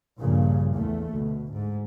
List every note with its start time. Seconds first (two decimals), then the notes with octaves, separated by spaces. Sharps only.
0.19 A#1 G2 A#2 C#3 A#3
0.74 E2 A3
1.13 D2 B2
1.53 G#2